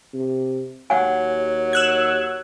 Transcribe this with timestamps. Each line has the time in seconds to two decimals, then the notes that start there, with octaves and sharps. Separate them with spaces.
0.14 C3
0.90 D#2 F#3 F#5 G#5
1.73 E6 F#6 G#6